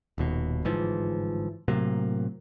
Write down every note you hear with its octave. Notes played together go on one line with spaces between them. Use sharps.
D#1 D#2 B2
G1 G#2 E3 F3
A2 C3 F#3 A#3